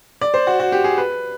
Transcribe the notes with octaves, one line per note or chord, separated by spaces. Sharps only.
D5
C5
F#4
F#4
G4
G#4
B4